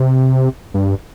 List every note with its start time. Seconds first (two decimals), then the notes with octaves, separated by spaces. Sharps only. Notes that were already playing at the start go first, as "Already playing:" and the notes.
Already playing: C3
0.74 G2